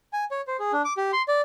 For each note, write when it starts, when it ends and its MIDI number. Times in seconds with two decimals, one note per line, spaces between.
0.13 0.25 80
0.31 0.41 73
0.47 0.57 72
0.59 0.72 68
0.73 0.82 62
0.85 0.93 86
0.97 1.11 67
1.13 1.22 84
1.28 1.41 74